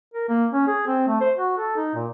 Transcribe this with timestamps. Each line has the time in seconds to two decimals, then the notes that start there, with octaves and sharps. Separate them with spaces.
0.14 A#4
0.29 A#3
0.52 C#4
0.68 G#4
0.87 C4
1.08 A3
1.21 C5
1.37 F#4
1.58 A4
1.76 D#4
1.95 A#2